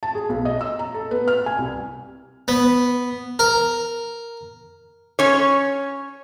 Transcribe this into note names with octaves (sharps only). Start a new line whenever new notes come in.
A5
G#4
B1
D#5
E6
A#5
A4
B3
F6
G#5
C2
B3
A#4
C#4 C#5